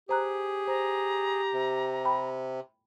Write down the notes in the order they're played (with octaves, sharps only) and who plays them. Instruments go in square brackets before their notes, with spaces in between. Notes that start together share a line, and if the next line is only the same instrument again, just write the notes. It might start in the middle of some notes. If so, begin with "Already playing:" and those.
[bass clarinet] G4 [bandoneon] G#4 [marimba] C5 A#5 F#6
[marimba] C5 [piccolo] A#5
[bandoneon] C3
[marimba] G5 B5